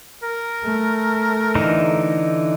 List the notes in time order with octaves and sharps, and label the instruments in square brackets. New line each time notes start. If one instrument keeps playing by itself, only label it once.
[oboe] A#4
[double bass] A3
[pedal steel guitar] D3 E3 D#4